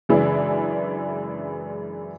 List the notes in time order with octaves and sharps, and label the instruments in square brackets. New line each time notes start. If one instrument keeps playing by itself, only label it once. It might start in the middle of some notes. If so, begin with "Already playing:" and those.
[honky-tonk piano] F#2 C#3 E3 G#3 D4 E4